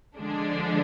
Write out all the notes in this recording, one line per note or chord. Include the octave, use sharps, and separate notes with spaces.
D3 F3 G#3 D4